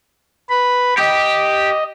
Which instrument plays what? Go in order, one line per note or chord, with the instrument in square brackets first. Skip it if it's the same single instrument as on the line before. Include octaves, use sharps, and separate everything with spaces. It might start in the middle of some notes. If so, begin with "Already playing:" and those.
[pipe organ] B4 B5
[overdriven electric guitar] G4 [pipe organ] D#5